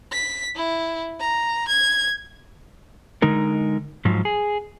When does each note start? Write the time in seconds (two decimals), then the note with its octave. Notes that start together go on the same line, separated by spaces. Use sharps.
0.12 B6
0.56 E4
1.20 A#5
1.68 G#6
3.22 D3 G#3 D#4 A#4
4.05 G#2 F3 F#3
4.25 G#4